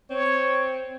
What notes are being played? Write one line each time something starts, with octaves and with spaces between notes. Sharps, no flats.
C4 C#5